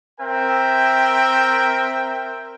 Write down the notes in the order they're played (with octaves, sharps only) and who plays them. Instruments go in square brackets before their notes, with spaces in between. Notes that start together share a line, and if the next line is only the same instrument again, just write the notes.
[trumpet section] C4 A#4 E5 G5